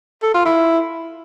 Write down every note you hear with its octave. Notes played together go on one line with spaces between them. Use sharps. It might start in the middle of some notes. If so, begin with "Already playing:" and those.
A4
F4
E4